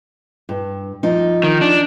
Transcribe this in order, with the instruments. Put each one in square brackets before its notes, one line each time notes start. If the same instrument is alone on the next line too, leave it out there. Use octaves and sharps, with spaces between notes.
[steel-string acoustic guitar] G2
F3 D#4
[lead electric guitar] D#3
D4